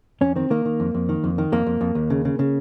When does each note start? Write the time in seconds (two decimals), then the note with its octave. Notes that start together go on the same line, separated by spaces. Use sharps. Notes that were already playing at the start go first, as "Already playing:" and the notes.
0.21 F2 C#4
0.36 D#3 C4
0.50 D#3 A#3
0.65 D#3
0.80 F2
0.94 F2
1.09 D#3
1.24 F2
1.38 D#3
1.52 F2 A#3
1.67 F2
1.81 F2
1.95 D#2
2.10 C#3
2.25 C#3
2.39 C#3